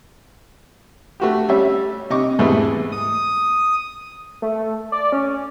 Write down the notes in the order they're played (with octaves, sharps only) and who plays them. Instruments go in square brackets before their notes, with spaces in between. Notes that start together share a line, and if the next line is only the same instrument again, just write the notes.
[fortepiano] A3 F#4 G4
G3 C#4 E5
C3 D#5 C#6 D6
E2 G#2 C3 E3 A3
[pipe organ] D#6
[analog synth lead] A3
D5
C#4